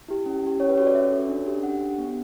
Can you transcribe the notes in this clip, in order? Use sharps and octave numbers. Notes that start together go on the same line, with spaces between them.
E4 G4
C#4
E4 G4
C#4 C#5
B4
F#4 A4 C#5
D5
C#4 E5
F#4 A4
D4
G4
D4 F#5
G4
B3